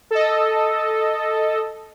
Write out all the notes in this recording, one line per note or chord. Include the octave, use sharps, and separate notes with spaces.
A4 D#5